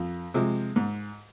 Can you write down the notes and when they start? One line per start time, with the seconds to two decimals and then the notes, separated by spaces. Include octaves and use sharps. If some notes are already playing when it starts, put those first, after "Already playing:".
Already playing: F2
0.34 C3 F3 G#3
0.76 G#2